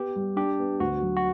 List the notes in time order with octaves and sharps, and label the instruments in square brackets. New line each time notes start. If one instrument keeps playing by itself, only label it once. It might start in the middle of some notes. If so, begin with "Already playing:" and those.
Already playing: [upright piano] B3 [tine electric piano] G4
[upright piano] G3
[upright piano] D4 [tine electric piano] G4
[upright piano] B3
[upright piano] D2 [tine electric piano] F#4
[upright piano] F#3
[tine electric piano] F#4